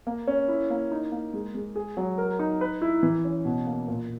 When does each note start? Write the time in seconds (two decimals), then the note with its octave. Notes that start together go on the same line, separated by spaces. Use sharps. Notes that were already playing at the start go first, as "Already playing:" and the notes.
0.07 A#3
0.27 C#4
0.48 E4
0.70 A#3
0.92 D#4
1.12 A#3
1.33 G#3
1.55 G#3
1.76 G#4
1.97 F#3
2.18 A#4
2.39 D#4
2.61 B4
2.82 E4
3.03 E3
3.25 C#4
3.45 B2
3.67 A#3
3.88 A#2